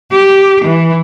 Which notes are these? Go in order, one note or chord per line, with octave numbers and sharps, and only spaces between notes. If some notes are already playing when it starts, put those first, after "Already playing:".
G4
E3